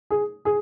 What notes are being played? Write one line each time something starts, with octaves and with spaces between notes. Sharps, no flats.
G#4
G#4